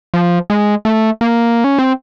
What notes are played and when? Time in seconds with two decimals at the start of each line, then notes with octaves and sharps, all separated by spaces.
0.14 F3
0.50 G#3
0.85 A3
1.21 A#3
1.64 C#4
1.79 C4